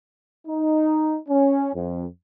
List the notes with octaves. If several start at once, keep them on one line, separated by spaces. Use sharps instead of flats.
D#4
C#4
F2